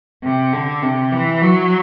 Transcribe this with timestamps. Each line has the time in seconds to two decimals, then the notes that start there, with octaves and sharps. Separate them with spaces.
0.23 C3
0.53 D3
0.83 C3
1.12 E3
1.42 F#3